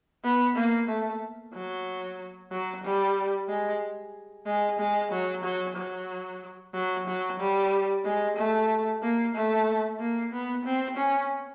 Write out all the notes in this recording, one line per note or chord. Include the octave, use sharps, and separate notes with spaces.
B3
A#3
A3
F#3
F#3
G3
G#3
G#3
G#3
F#3
F#3
F#3
F#3
F#3
G3
G#3
A3
A#3
A3
A#3
B3
C4
C#4